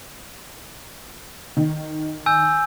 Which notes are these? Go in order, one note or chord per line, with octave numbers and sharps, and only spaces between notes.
D#3
G#5 E6 G6